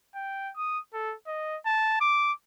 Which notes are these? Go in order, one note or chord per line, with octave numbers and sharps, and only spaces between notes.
G5
D#6
A4
D#5
A5
D6